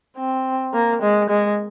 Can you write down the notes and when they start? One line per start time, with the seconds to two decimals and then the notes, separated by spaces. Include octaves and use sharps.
0.17 C4
0.73 A#3
1.02 G#3
1.30 G#3